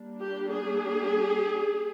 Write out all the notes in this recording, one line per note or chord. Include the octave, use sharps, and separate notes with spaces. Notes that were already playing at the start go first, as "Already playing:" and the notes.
Already playing: G3 A#3 D4
G4
G#4